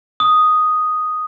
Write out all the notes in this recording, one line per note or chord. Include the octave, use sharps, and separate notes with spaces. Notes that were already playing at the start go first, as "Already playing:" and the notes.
D#6